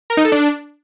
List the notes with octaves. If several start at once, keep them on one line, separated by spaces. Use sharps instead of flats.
A#4
D#4
A4
D4